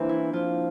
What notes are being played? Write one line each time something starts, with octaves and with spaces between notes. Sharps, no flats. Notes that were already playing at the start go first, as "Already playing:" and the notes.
Already playing: E3 A#3 C4 D4
E4
F3 F4